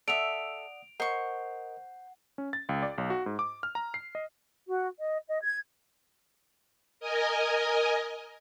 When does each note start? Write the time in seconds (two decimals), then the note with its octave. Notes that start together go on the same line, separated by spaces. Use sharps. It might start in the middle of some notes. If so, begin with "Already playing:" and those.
0.08 A4 D5 E5 F#5 D#6 D7 F7
1.00 A#4 C5 D#5 F#5 C#6
2.38 C#4
2.53 A6
2.69 C#2
2.83 D5
2.98 B1
3.10 F#4
3.26 G#2
3.39 D6
3.63 F6
3.75 A#5
3.94 C7
4.15 D#5
4.68 F#4
4.99 D#5
5.28 D#5
5.43 G#6
7.00 A#4 D#5 G#5